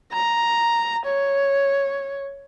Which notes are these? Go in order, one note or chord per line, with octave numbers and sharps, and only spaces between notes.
A#5
C#5